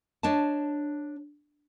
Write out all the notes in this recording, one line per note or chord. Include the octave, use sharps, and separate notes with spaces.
D4 C#5 D#5 A5